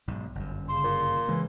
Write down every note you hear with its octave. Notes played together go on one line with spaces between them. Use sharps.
B1 G#2
G1 F#2
C#3 C6
A#2
C#3 E3 G#3